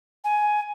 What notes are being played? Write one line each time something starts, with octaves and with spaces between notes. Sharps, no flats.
G#5